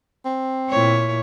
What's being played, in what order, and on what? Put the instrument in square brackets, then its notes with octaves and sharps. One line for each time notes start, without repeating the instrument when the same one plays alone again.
[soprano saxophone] C4
[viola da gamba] A#2 E4 C#5